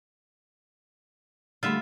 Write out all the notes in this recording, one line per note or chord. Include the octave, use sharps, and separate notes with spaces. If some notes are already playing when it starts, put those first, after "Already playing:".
D3 G3 A3 F4 E5